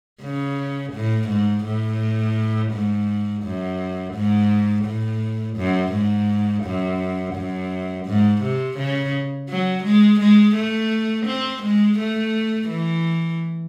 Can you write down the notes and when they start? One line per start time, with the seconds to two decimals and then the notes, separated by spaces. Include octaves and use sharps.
0.22 C#3
0.93 A2
1.29 G#2
1.65 A2
2.72 G#2
3.43 F#2
4.14 G#2
4.85 A2
5.57 F#2
5.92 G#2
6.64 F#2
7.35 F#2
8.06 G#2
8.42 C3
8.78 C#3
9.49 F#3
9.84 G#3
10.20 G#3
10.55 A3
11.26 C4
11.63 G#3
11.99 A3
12.69 E3